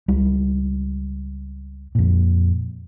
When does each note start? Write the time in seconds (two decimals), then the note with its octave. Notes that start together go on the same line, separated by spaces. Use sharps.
0.08 C#2 G3
1.95 F2 A#2